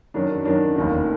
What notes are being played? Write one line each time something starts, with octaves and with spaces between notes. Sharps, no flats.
F#2 D#3 F#3 D4
F#2 D#3 F#3 D4
F1 D#2 D#3